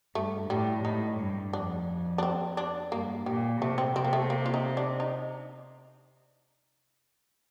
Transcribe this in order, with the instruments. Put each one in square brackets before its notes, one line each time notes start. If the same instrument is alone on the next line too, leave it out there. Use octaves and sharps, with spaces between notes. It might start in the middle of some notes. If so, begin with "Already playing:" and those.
[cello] G2 [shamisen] A3
[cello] A2 [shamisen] G3
[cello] A2 [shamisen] D#4
[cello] G2
[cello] F2 [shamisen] D4
[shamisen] D4
C4
D4
[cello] G2 [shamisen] A#3
[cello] A#2 [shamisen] G3
[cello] C3 [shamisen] A3
[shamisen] C4
[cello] C3 [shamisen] C4
[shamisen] A#3
A3
A#3
F4
D#4
D4
D#4